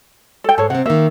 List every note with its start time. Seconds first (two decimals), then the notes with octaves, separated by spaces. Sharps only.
0.44 A4 G5
0.58 G#2 A4 C#5
0.70 C3 C4 F#5
0.86 D#3 A#3 E5